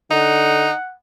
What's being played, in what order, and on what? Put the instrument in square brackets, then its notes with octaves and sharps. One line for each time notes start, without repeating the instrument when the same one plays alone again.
[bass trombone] D3 [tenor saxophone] D#4 [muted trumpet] F#5